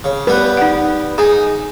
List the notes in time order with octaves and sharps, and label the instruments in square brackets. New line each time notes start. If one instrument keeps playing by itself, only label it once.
[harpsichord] C#3
[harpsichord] G3 B3 [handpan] B4
[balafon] D#4 F#5
[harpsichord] D#4 [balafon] G#4 G#5